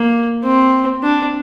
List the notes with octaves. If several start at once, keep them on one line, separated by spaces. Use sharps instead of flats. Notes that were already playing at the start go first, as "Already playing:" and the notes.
Already playing: A#3
C4
D4